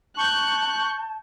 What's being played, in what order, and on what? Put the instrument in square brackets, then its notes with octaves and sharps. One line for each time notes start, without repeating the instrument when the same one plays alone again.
[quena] A5 [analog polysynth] C#6 G6 [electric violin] F#6